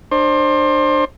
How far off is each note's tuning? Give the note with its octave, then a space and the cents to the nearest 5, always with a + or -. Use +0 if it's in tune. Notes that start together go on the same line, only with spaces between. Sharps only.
D4 +30 C5 +25